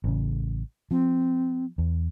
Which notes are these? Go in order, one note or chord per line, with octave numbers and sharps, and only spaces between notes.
A1 C#3
F3 C4
E2